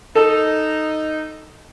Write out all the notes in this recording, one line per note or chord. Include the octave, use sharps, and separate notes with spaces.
D#4 A4